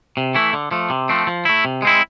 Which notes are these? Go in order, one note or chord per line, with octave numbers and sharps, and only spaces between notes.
C3
E3 A3 E4
D3
F3 A3
C3
F3 A3 C4
F3
A3 E4
C3
G#3 C4 E4